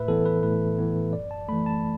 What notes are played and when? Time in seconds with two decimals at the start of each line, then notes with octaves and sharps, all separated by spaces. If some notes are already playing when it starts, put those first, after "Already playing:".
Already playing: A2 B4 E5
0.08 E3 B3 A4
0.26 B4
0.43 A2 B4
0.78 E3 B3
1.13 F#2 D5
1.31 A5
1.48 E3 A3 B5
1.66 A5